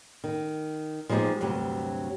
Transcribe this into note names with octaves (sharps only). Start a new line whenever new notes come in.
D#3
F3 G#3 B3 D#4 G4
D2 G2 C3 F#3